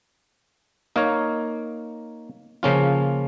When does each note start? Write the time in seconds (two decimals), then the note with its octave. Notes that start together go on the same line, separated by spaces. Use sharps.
0.96 A#3 D#4 A#4 C#5
2.63 C#3 F3 A#3 C#4 F4